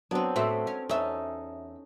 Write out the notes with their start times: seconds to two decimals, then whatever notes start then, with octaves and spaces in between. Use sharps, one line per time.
0.11 F#3 B3 C4 D4
0.36 A2 C4 F#4 A4 B4 E5
0.67 C#4
0.89 E2 C#4 D#4 A4 E5